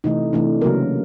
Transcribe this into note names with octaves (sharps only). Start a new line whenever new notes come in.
C3 E3 A3 D#4
C3 E3 A3 D4
C#3 F#3 A#3 A#4